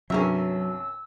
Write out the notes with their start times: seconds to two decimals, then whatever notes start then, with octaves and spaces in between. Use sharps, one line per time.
0.10 C2 G2 F#3 C#4 G#4 A#4 E5 E6